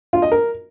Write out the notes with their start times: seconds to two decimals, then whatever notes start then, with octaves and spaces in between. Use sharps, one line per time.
0.13 F4
0.22 D#5
0.32 A#4